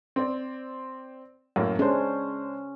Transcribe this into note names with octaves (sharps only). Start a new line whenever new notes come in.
C4 D5
F#2 A2 A#3
G#3 C#4 D4 C5